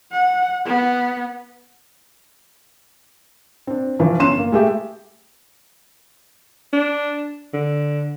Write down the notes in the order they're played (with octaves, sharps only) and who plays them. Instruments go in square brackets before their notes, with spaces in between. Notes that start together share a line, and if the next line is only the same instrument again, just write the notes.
[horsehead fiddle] F#5
B3
[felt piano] C4 D4
G2 E3 F3
G1 C#4 C6 E7
A#3
G#3 A3 G4 E5
[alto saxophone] D4
D3